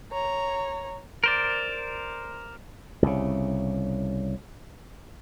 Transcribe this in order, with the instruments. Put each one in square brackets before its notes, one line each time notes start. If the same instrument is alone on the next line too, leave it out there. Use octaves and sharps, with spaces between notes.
[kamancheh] C#5 A#5
[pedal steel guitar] A#4 C5 D5
[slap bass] C2 C#3